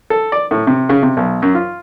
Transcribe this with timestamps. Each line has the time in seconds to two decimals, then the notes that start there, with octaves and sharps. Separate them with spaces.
0.10 A4
0.32 D5
0.51 A2
0.67 C3
0.89 C#3
1.03 C3
1.17 B1
1.42 F#2
1.55 F4